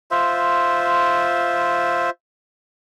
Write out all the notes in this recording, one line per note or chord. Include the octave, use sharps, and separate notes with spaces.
F4 C5 E5